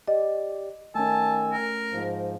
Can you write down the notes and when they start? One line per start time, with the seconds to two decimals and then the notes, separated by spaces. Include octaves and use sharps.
0.08 G4 D5 D#5
0.95 D#3 A3 C#4 G#5 A5 E6
1.52 A#4
1.92 G#2 F3